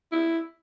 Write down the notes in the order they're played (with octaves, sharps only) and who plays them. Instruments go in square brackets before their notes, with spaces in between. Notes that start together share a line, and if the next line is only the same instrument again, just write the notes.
[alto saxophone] E4